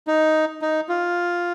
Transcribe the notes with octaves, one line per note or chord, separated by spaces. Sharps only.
D#4
D#4
F4